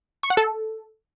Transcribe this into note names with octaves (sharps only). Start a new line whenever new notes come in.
C#6
F#5
A4